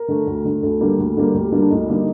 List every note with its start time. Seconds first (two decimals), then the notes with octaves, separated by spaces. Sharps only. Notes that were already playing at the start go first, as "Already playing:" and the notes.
Already playing: A#4
0.08 D3 A3
0.27 D2
0.45 D3 A3
0.63 D2 A4
0.80 D3 G3 A#3
0.98 D2
1.17 D3 G3 A#3
1.34 D2 G4
1.52 D3 G3 A#3
1.62 D4
1.70 D2 D#4
1.88 D3 G3 A#3 D#4